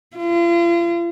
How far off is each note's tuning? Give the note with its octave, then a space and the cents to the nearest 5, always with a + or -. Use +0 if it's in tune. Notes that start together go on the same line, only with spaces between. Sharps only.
F4 -40